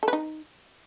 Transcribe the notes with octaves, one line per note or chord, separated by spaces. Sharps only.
A4
B4
D#4